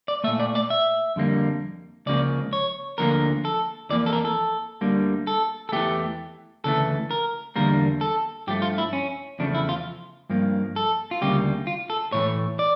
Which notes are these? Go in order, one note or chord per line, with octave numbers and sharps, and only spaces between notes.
D5
A#2 A3 E5
D5
D5
E5
F2 D3 G3 A#3
C#2 C#3 F3 A#3 D5
C#5
D2 D3 F3 A#3 A#4
A4
F2 E3 A#3 D5
A4
A#4
A4
D2 D3 G3 A#3
A4
A4
E2 E3 A3 G4
D2 C#3 E3 A3 A4
A#4
E2 D3 G3 A#3 A#4
A4
G2 F3 A3 G4
F4
E4
C#4
E2 C#3 F3 A3 D4
E4
F4
G2 F3 A#3
A4
F4
D2 C#3 G3 A#3 G4
F4
A4
A2 E3 A3 C#5
D5